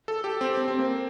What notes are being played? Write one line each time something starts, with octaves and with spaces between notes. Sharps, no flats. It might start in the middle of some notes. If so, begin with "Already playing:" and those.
A4
G4
C4
C4
C4
A#3